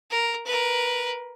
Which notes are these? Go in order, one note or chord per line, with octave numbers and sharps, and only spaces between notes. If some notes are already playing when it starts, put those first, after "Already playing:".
A#4
A#4 B4